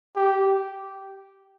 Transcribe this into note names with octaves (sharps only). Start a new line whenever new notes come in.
G4